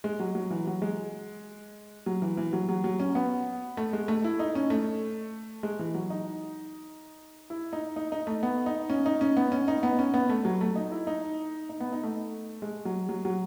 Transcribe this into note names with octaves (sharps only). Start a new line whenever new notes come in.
G#3
F#3
F#3
E3
F#3
G#3
F#3
E3
E3
F#3
F#3
F#3
C#4
B3
A3
G#3
A3
E4
D#4
C#4
A3
G#3
E3
F#3
D#4
E4
D#4
D#4
D#4
A3
B3
D#4
C#4
D#4
C#4
B3
C#4
D#4
B3
C#4
B3
A3
F#3
A3
D#4
E4
D#4
D#4
B3
D#4
A3
G#3
F#3
F#3
F#3